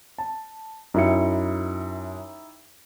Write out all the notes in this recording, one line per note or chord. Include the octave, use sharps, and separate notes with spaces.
A5
F#2 D#4 E4 G4 C#7